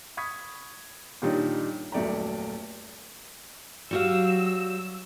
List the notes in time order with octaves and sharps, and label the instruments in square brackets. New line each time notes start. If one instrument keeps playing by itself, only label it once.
[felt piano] B5 C#6 D#6 G#6 B6
A#2 D#3 G3 D4 D#4 C#5
D#1 F#2 A3 D5 G5 A#5
[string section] F#3 E6 [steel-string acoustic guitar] G3 F#4 F5